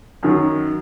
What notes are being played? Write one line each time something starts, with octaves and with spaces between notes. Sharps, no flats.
F#2 D#3 F#3